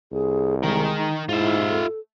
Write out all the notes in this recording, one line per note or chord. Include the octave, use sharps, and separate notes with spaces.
C2 G#4
D#3 G#3 A#4
G#2 E4 F4 E5
A4